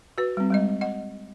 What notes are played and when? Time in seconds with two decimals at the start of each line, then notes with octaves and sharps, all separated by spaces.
0.18 F#4 B4
0.37 G3 C4
0.50 G3 G#3 D#5
0.81 D#5 F#5